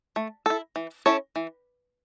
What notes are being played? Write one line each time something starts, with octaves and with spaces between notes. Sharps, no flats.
A3
E4 A4
E3
C#4 E4 A4 C#5
E3